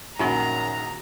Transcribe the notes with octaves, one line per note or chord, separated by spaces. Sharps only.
A#1 F#2 D#3 C#4 F#4 G#4 A#5